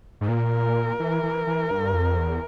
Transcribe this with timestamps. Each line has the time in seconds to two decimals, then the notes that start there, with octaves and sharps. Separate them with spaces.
0.21 G#2
0.29 A#2 A#4
1.00 E3
1.23 E3
1.47 E3
1.71 G2
1.94 F2
2.18 E2